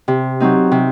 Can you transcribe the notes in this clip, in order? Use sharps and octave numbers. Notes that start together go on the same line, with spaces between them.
C3
F#3 C4 D#4
C3